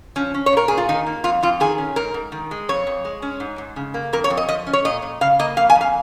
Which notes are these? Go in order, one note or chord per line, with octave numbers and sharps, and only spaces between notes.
F3 C#4
C#4
C#5
A#2 A#4
A#2 G#4
F4
D#3 D#4
A#3
F2 F4
F2 F4
D#3 G#4
C#4
G#2 A#4
G#2
D#3
G#3
F2 C#5
F2
G#3
C#4
G#2
G#2
C#3
A#3
F2 A#4
C#5
F2
D#5
F3 D#5
C#4
C#5
A#2 D#5
A#2
C#3 F5
A#3 D#5
F2 F5
G#5
F2
F5